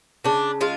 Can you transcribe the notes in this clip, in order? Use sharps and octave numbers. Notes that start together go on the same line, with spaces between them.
C#3 D4
G#3 F4